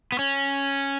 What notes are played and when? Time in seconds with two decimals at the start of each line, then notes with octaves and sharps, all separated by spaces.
0.12 B3
0.19 C#4